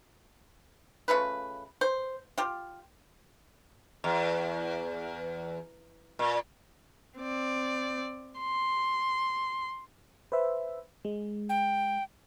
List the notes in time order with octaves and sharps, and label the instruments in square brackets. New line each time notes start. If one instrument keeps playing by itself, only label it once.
[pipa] C#3 A3 F4 B4
C5
F4 G4
[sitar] E2
A#2
[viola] C4 D5
C6
[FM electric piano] B4 C5 E5
G#3
[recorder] G5